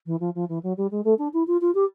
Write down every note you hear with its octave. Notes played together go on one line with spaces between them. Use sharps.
E3
F3
F3
E3
F#3
G3
G#3
A3
D4
E4
F4
F4
G4